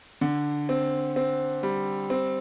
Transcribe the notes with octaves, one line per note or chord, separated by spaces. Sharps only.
D3
C4
C4
G3
C4